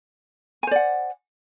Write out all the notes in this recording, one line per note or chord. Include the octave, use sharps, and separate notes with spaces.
C5 D5 F#5 G#5